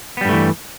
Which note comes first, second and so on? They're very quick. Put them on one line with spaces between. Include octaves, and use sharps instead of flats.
B3 G3 G2 A3 E3